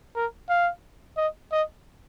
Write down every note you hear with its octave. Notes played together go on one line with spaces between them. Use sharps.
A#4
F5
D#5
D#5